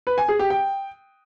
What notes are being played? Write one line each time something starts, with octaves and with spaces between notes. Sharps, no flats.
B4
G#5
G#4
G4
G5